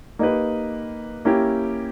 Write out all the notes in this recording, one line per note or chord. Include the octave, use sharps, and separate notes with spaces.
A#3 D#4 G4 B4
A#3 C#4 E4 G4